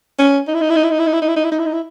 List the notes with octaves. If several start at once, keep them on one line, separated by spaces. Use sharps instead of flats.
C#4
D#4
E4
D#4
E4
D#4
E4
D#4
E4
D#4
E4
D#4
E4
D#4
E4
D#4
E4
D#4
E4